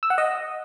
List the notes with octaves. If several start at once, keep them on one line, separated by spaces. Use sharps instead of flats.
E6
F#5
D#5